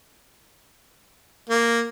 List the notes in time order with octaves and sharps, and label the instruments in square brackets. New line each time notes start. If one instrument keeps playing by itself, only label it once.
[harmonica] A#3